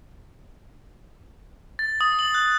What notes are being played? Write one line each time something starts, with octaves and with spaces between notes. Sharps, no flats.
A6
D#6
F#7
F#6